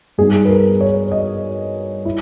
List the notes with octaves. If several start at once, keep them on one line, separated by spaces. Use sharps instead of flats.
G2 G3 B3 D#4 G#4
B4
A#4
C#5
D#5
E4